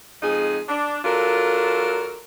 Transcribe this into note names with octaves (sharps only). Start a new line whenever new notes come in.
F2 G#3 D#4 G#4
D4
F#3 D4 F4 A4 A#4